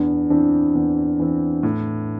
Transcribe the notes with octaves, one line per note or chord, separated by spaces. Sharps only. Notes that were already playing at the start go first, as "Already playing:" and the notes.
Already playing: E2 D4
E3 C4 D4
E2
E3 C4
A2 E4